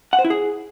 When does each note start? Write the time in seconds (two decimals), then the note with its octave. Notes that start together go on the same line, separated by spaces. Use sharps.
0.13 F#5
0.19 C5
0.24 E4
0.30 G#4